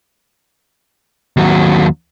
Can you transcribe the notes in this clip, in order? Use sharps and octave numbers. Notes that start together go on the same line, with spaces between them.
D#2 F#3